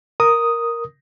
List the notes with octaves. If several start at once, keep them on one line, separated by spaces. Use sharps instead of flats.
A#4 D#6